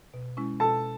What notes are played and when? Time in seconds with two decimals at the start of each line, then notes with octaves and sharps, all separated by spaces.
0.14 B2
0.37 G#3 C#4 E4
0.60 B2 A4 A5